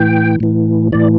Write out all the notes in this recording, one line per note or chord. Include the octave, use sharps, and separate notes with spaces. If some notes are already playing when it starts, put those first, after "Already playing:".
Already playing: A2 E3 G5
A2 E3
A2 E3 D5